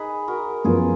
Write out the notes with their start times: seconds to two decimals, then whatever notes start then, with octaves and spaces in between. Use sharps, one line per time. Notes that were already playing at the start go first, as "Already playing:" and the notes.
Already playing: D#4 G#4 B4
0.28 F#4 A#4
0.64 F#2 F3 B3 F4 G#4